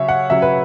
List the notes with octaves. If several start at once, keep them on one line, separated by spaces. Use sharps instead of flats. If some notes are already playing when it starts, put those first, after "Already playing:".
Already playing: C#3 F#3 C#5 E5
F#5
C#3 F#3 E5
B4